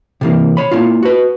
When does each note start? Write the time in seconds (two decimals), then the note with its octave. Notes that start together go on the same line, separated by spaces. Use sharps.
0.21 C3 E3 A#3
0.57 C#5 B5
0.71 A#3 E4 F4
1.03 F#4 B4